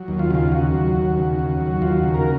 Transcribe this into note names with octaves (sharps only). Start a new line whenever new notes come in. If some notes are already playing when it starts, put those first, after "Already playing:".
Already playing: F#3
D#2
F4
C#3 F4
D#2 F#4
F#3
D#2
C#3
D#2
F#3
D#2 F4
C#3 F#4
A#4